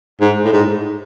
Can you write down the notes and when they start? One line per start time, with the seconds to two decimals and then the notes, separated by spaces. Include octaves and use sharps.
0.21 G#2
0.45 A2
0.53 G#2